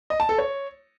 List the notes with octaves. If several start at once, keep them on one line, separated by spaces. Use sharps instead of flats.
D#5
A5
A4
C#5